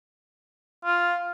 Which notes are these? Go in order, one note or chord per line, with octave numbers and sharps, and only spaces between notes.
F4